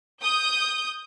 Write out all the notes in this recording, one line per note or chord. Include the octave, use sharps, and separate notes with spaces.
D#6 G6